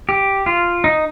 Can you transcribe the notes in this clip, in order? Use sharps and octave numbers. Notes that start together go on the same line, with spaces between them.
G4
F4
D#4